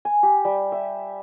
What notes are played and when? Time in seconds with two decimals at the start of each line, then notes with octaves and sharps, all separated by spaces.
0.05 G#5
0.23 G4
0.45 G3
0.72 E5